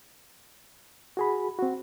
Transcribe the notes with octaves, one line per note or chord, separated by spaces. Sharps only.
F#4 G#4 B5
C4 F#4